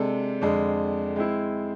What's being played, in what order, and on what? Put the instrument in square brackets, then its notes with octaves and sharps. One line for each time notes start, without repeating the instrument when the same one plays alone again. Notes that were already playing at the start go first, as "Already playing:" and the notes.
Already playing: [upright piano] C3 G#3 D4 A4
F2 D3 G#3 D4
G#3 C4 E4